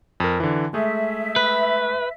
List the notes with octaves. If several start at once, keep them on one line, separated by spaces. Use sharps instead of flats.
F2 A#4
D3 E3
G#3 A3 G#4 E5
B4